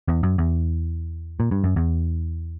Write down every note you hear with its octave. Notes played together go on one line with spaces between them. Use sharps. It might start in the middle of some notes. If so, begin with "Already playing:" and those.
E2
F#2
E2
A#2
G2
F#2
E2